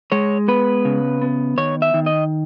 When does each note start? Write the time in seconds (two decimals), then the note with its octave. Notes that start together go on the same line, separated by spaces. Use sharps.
0.12 G#3 C#5
0.48 B3 B4
0.85 C#3
1.22 B3
1.58 D#3 C#5
1.82 E5
1.94 D#3
2.06 D#5